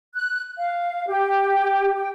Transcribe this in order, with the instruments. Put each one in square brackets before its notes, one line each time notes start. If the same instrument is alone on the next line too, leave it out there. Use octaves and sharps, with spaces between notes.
[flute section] F#6
F5
G4
G5